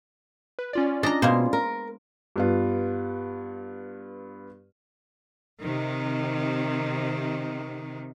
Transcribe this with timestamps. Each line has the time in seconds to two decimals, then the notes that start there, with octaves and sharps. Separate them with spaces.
0.59 B4
0.73 C#4 F4 D5
1.03 D4 D#5 A#5
1.22 B2 G#3 A#3 C5
1.53 A#4
2.36 G2 B3 F4
5.61 C3 D#3